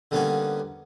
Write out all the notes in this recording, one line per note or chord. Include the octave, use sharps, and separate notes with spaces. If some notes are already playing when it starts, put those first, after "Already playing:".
D3 G3 A#3 B3 C#4 F#4